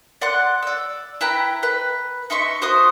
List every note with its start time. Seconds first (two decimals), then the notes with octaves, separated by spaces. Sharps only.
0.22 D5 F#5 C6 F#6
0.62 D5 E6
1.21 E4 B4 G5 A#5
1.63 B4
2.30 D#4 E5 C6 C#6
2.62 F#4 C5 C6 D#6